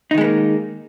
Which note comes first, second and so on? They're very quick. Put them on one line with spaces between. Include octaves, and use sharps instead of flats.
D#4 D#3 G#3 B3 A#3